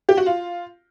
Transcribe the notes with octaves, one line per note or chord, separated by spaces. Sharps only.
G4
F#4
F4